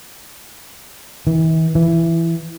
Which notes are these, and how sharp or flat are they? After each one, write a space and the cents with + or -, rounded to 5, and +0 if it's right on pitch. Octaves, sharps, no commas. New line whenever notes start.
E3 -40
E3 +10